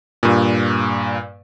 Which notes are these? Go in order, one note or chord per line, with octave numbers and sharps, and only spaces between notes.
G2 A#2